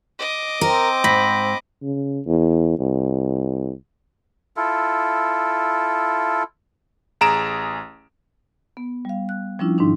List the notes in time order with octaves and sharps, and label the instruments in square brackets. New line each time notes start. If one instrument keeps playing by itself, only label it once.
[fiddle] D#5 D6
[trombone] C4 [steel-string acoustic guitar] A#4
[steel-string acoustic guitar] G#2 [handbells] B5 A#6 B6
[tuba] C#3
E2
C2
[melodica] E4 F4 A4
[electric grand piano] A1 G#4 A#5 D7 E7
[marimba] B3
G3 F5
F#6
F3 G3 C#4 D4 E4 F4
G#2 D#3 D4 D#4